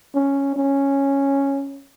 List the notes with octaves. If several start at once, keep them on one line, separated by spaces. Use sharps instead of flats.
C#4
C#4